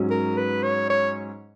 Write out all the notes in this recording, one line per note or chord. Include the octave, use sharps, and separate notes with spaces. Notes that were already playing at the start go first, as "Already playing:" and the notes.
Already playing: G#2 F#3 C#4 F#4
A#4
B4
C#5
C#5